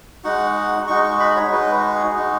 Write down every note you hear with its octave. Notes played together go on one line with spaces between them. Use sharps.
G#3 D#4 F#4 F#5
G#3 D#4 F#4 C#6
C#6
B5
C#5
G#3 D#4 F#4 B4
G#4
G#3 D#4 F#4